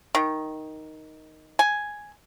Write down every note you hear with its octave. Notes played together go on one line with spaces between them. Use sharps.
D#3
G#5